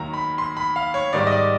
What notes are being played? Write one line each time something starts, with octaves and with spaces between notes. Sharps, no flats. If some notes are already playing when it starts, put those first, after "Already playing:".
Already playing: D#2 D#3 F#3 A#5
B5
C6
B5
F5
C#5
G#2 D#3 G3 D5
D#5
D5